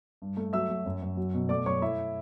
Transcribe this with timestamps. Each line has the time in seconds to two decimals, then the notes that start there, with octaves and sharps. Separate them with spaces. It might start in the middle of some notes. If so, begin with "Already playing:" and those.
0.22 G2
0.37 A3
0.53 F#3 E5 E6
0.70 F#3
0.86 F#2
1.02 F#2
1.17 F#3
1.34 B2
1.49 A3 D5 D6
1.66 F#2 C#5 C#6
1.82 A3 E4 E5